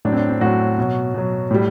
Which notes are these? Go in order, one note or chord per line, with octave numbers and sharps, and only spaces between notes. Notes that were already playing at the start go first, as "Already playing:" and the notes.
A2 F#3 D4
C4
D4
C4
A2 F#3 F#4
B2 F#3
B2 F#3
A2 G3